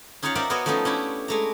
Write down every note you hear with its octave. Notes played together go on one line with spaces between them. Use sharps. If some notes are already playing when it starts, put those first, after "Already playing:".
C#4 D#4 F4 C#5 F5 F#5
A#4 C5 D5 E5 F#5 G5
B3 F#4 A#4 C5 C#5 D#5
F3 A3 B3 C#4 D#4
C#4 D4 E4 G4
G#3 A3 A#5